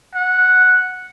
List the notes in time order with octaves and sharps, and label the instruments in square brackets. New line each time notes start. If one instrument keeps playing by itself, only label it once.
[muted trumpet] F#5